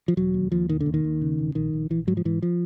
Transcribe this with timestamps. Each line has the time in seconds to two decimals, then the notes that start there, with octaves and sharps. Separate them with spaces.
0.08 F3
0.17 E1 F#3
0.34 D#2
0.52 D#2 F3
0.69 E1 D#3
0.80 D3
0.86 D#2
0.94 D#3
1.04 D#2
1.21 C#3
1.39 E1
1.55 A#1 D#3
1.73 A#1
1.90 A#1 E3
2.07 G#2 F#3
2.17 F3
2.25 G#2 E3
2.42 F3